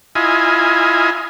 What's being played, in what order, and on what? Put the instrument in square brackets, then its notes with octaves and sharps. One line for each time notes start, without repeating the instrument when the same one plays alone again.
[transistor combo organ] E4 F4 D#5 G#5